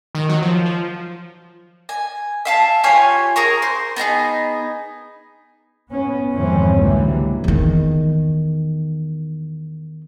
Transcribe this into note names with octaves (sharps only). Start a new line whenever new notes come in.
D#3
F#3
F3
F3
G#5
E5 F5 A5
F4 G4 C#5 G#5
G#4 A#4 A#5 C#6
C5
B3 D#4 G4 G#4
B3 C#4
F2 G#2 D#3 E3 C4 C#4
C#2 D3 E3 F#3 G3 A#3
E2 D#3